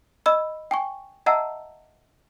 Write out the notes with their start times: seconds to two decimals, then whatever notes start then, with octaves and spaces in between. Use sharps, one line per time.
0.26 D#5 B5 E6
0.71 G5 G#5 C#6
1.26 D#5 E5 F#5 A5 A#5 E6